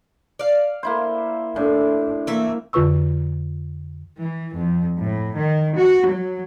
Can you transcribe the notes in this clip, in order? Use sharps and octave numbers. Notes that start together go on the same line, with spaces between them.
D5 F5
A#3 E4 C5
A2 D4
E3 A3 A#3 E5
F2 D3 F4 B4 C#6 E6
E3
F2
A2
D#3
F#4
F#3